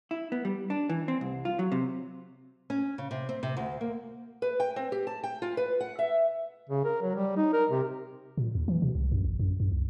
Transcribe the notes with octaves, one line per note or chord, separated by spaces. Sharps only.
E4
B3
G3
D4
E3
C4
C2
F4
F#3
C3
C#4
C#3
C3
C4
C3
D2
A#3
B4
G5
C4
G4
A5
G5
F4
B4
F#5
E5
C#3
A#4
F#3
G3
D#4
A#4
C3
A#2
D#2
E3
B2
C2
F#2
A1
F#2
F#2
C2